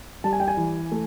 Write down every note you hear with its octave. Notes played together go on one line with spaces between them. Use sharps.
G3 A5
G#5
G5
G#5
E3
A3